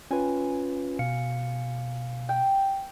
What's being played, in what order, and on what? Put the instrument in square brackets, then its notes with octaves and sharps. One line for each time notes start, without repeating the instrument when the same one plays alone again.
[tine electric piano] C#4 F4 B4 [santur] G#5
[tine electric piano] B2 F5 C#7
[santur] G5